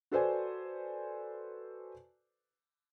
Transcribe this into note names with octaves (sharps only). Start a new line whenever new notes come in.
F#4 A4 B4 C5 D5 G#5